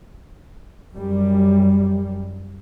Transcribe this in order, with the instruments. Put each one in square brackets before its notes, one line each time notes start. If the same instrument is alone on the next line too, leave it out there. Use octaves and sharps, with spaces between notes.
[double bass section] F#2 G3